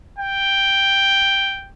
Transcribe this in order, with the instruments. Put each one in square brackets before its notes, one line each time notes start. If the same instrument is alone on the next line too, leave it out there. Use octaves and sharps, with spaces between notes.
[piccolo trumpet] G5